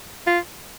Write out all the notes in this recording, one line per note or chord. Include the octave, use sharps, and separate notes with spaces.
F4